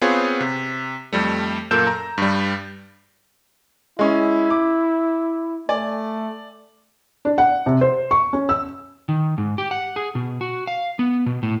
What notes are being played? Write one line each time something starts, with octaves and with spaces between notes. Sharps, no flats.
B3 C4 F4 G#4 C#5
C3
F2 G3 A3
F#2 A#2 A#3 A4 G6 E7
A#5
G2 G3
G#3 C#4 E4
D6
A3 D5 G#5
D4
F#5
C3
C5
C#6
C#4
E6
D#3
G#2
G4
F#5
G#4
B2
F#4
F5
B3
B2
A2